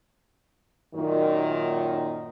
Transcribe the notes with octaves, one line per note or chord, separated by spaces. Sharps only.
F#2 A#2 D#3